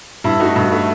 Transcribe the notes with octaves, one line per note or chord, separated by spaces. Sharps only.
G2 E4
A3 D#4 F#4
G2
A3